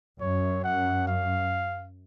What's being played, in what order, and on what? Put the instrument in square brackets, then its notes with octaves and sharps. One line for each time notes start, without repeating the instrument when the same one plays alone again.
[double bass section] F#2 [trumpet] C#5
[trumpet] F#5
F5